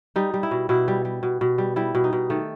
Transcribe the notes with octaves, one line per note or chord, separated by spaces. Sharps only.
G3 D#4
G3
E4
B2
B2 E4
G3
G3
B2
B2
G3
G3 E4
B2
D#4
B2
D#3 A3